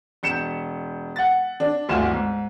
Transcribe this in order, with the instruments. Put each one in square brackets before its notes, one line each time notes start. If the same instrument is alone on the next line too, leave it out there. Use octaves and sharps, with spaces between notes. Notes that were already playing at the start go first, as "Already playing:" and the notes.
[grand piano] E1 G6 C#7 E7
F#5 A6
D4
G1 D2 A2 F4 G#5 E7
G#2